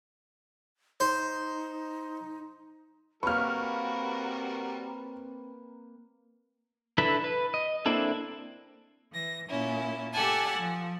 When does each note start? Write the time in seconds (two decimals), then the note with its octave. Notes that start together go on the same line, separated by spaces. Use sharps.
1.00 D#4 C5
3.23 G3 A#3 C4 F#4 A#4 B4 C#6 F6
6.98 D4 E4 A4 B4 B5
7.24 B4
7.54 D#5
7.86 A#3 C4 D4 E4 A4
9.12 E3 A#6
9.49 A#2 C#4 E4
10.13 G4 A4 D5 F#5 G#5 A5
10.57 F3